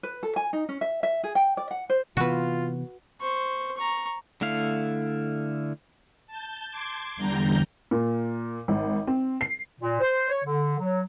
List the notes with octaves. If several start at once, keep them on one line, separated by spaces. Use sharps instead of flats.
B4
A4
G#5
D#4
C#4
E5
E5
G#4
G5
D5
F#5
C5
C3 E3 B3 F4 F#4 B4
C5 C#6
A#5 C#6
D3 A3 E4 F5
A5 G6
C6 D6 G#6
E2 D3 G3 A#5 G6
A#2
G#1
C4
C7
A#2
C5
C#5
D3
F#3